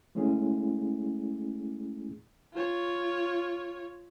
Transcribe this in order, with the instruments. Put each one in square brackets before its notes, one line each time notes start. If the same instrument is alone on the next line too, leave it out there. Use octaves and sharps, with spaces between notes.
[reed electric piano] G#3 A3 C#4 E4 G#4
[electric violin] F4 C#5